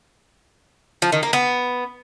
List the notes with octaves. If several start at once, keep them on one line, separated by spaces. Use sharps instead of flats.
F3
D#3
A#3
B3